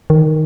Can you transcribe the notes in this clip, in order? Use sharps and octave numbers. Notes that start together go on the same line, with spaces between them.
D#3